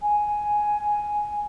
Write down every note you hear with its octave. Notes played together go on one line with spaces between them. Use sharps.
G#5